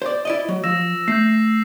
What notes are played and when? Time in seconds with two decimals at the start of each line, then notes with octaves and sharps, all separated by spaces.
0.02 C5 D5
0.25 E4 D5 D#5
0.48 F#3
0.64 F3 E6 A#6 E7
1.08 A3 G6 C7